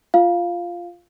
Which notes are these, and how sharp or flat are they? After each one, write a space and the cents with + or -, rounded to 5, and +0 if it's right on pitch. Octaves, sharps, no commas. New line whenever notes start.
F4 -5 F5 +0